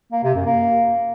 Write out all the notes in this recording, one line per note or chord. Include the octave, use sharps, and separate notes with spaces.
A#3
C3
F#2
A#3